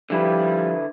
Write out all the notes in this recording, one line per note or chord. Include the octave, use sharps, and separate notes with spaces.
D3 F3 G3 E4 B4